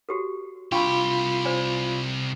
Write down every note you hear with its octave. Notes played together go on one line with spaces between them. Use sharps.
F#4 G4 A4
C2 D4 F4 G4 G5 B5 C#6
C5 D5 G#5